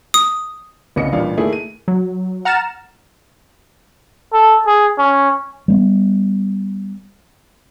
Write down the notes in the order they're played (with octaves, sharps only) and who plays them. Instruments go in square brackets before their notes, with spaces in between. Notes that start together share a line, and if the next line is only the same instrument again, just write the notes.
[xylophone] D#6
[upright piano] C2 C#3 D#5 C#7
A1 A#2 G3 D4 F5
D#3 A3 A#3 E4 G#4
D#7
[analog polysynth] F#3
F#5 A#5 F6 A6 E7
[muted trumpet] A4
G#4
C#4
[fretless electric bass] G3 A#3 B3